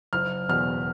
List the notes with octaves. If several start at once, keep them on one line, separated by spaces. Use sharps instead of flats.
F#1 F6
E2 B2 F6